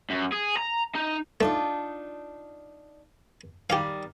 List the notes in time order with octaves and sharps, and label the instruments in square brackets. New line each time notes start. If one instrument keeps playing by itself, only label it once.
[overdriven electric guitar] F#2
G#4
A#5
D#4
[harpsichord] A3 [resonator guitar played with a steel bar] D4 D#4 F4
[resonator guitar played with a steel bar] D#3 G3 [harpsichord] G4 F5